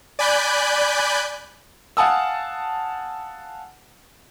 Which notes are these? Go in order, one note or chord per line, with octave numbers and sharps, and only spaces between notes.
D5 G#5 B5 F#6 G6
F5 F#5 G#5 A5 D#6 E6